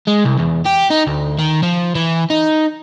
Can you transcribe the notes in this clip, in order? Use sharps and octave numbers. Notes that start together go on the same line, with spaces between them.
G#3
C2
E2
G4
D#4
D2
D#3
F3
E3
D#4